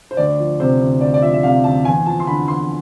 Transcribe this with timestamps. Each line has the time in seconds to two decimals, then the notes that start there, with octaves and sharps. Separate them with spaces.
0.11 C5
0.17 D2 D5
0.39 F3
0.60 C3 C5
0.81 D2
1.01 D2 D5
1.14 D5
1.22 F3 E5
1.33 E5
1.43 C3 F5
1.64 D2 A5
1.85 E2 G#5
2.06 F3 A5
2.20 C6
2.27 D3 B5
2.48 E2 C6